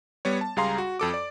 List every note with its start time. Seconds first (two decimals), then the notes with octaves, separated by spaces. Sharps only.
0.25 G3 B3 C#5
0.41 A5
0.56 C#2 G3 G#4 F5 A#5 C6
0.78 F#4
0.99 F2 A4 D6
1.14 D5